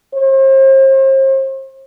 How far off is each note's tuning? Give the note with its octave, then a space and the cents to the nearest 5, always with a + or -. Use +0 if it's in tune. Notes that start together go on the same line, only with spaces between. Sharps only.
C5 +40